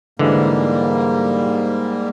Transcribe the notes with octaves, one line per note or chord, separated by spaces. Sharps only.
G#2 D3 E3 G3 G#3 A#3